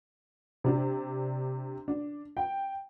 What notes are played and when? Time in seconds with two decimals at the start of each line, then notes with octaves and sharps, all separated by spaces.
0.64 C3 D4
1.88 D4
2.37 G5